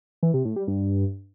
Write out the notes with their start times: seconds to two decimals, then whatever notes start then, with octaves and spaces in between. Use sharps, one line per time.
0.23 E3
0.34 C3
0.45 A2
0.56 G3
0.68 G2